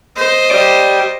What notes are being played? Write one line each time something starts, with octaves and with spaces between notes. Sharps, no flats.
C5 D#5
G4 D5